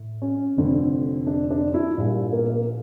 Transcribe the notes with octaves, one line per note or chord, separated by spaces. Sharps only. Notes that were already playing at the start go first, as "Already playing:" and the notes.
Already playing: A2
C#4
F1 F2 D3
D4
D4
E4
A#1 A#2 G3
A#3
A#3